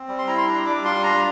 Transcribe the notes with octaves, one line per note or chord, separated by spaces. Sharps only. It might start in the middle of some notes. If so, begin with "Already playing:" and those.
Already playing: C4
G3
C6
E4 A#5
C6
D4 A#5
G3 D6
F4 C6
D4 A#5